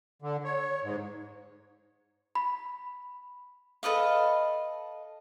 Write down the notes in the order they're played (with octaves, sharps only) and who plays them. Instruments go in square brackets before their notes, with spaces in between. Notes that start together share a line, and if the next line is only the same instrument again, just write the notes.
[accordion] D3
C#5
G#2
[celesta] B5
[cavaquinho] A4 B4 D#5 F5